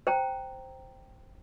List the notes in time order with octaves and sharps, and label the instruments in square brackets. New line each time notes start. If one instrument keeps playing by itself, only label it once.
[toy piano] C5 G5 A#5